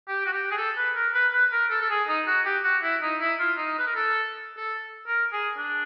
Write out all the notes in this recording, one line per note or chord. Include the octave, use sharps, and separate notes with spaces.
G4
F#4
G4
G#4
A4
B4
A#4
B4
B4
A#4
A4
A4
G#4
D#4
F#4
G4
F#4
E4
D#4
E4
F4
D#4
B4
A#4
A4
A4
A#4
G#4
D4